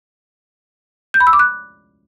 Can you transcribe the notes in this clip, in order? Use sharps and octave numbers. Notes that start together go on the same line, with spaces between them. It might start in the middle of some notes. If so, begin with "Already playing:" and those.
G6
B5
E6
D6
F#6